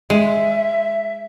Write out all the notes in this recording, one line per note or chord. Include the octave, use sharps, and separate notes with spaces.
G#3 E5